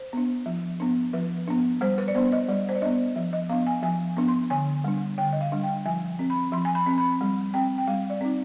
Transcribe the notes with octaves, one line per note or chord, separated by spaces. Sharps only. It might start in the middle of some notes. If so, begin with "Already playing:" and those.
Already playing: C5
B3 D4
F3
B3 D4
F3 B4
B3 D4
G3 C5
B4
D5
B3 D4 C5
D#5
G3 D5
C5
D5
B3 D4 D#5
F3
D#5
B3 D4 F5
G#5
F3 G#5
B3 D4
C6
D3 G#5
G3 D4
D3 G5
D#5
F5
G3 D4
G5
F3 G#5
C4
B5
F3 C6
G#5
B5
C4
B5
G3
C4 G5
G5
G3 F5
D5
C4 D#4